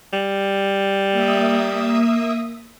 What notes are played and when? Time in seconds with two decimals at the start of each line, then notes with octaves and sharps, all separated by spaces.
0.13 G3
1.12 A#3 E5 D#6